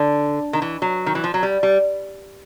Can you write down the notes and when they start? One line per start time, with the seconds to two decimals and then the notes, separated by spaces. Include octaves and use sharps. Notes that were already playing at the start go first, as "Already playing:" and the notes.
Already playing: D3
0.53 D#3
0.62 E3
0.82 F#3
1.06 D#3
1.15 E3
1.24 F3
1.34 F#3
1.43 G3
1.63 G3